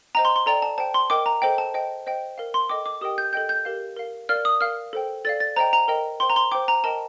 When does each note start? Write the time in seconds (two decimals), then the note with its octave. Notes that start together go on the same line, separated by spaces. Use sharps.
0.15 C5 D#5 G5 A#5
0.25 C6
0.36 C6
0.46 A4 D5 G5 A#5
0.62 A5
0.78 C5 G5 A5
0.94 C6
1.10 A#4 D#5 G5 D6
1.26 A#5
1.42 A4 C5 D#5 G5
1.58 A5
1.74 C5 D#5 G5
2.06 C5 D#5 G5
2.38 A#4 F5
2.54 C6
2.69 A4 D#5 G5 D6
2.86 D6
3.01 G4 A#4 D#5 G5 D#6
3.18 G6
3.33 A4 D#5 G5 G6
3.49 G6
3.65 G4 A#4 F5
3.97 A#4 F5
4.29 A#4 D5 F5 F6
4.45 D#6
4.61 A#4 F5 F6
4.93 A4 C5 G5
5.25 A4 D5 F5 A6
5.40 A6
5.56 C5 D#5 G5 A#5
5.73 A#5
5.88 A#4 D#5 G5
6.20 C5 G5 C6
6.30 A#5
6.36 C6
6.52 C5 G5 D6
6.68 A#5
6.84 A#4 D#5 G5 A5